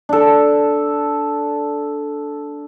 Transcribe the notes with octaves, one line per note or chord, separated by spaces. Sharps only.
D4 A4